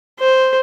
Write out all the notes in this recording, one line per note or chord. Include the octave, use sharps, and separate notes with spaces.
C5